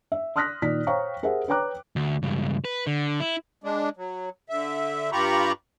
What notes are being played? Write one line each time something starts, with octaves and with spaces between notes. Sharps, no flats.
E5
C6 D#6 F6 F#6 A#6 B6
A#2 D#3 D5 B6
C5 C#5 F5 G5 A#5 C#6
G4 G#4 A#4 C5 E5 F#5
B4 C#5 G5 A#5 D6 F#6
D2
C#2 G2
B4
D3
E4
G#3 D4
F#3
D3 E5
G2 F4 G4 A#5 B5 C#6